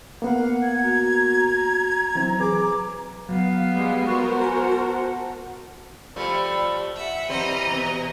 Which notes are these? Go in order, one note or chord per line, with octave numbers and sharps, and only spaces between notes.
A#3 B3 A#4 F5 F#5
G#6
F#4 A#5
E3 F#3 C4
G#4 B4 D6
F#3 B3 F5
G3 G#3
F#4 A#4 C5 C#6
F#5 G#5 A#5
A5
F3 G3 A3
E5 F#5
E3 G3 C4 C5 D#5 A#5
B2